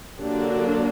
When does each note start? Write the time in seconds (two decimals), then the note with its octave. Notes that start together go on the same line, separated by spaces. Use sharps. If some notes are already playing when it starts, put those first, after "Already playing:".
0.19 D3 F#3 A#3 D4 G4